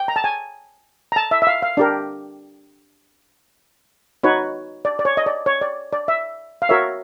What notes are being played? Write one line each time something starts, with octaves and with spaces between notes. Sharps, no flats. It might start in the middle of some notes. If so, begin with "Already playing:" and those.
Already playing: G5
A#5
A5
G#5
A#5
A5
E5
E5
F5
F5
D4 G4 A#4 D5
D#4 F#4 B4 C#5
D5
D5
C#5
D#5
D5
C#5
D5
D5
E5
F5
F#4 A#4 C#5 E5